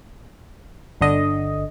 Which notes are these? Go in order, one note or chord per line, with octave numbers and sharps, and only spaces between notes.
G1 D3 D#5